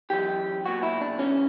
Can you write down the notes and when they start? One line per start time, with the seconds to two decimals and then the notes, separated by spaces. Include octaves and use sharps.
0.10 F#2 E3 G4
0.65 B1 A#2 F#4
0.83 E4
1.01 D4
1.18 D2 C#3 E3 C#4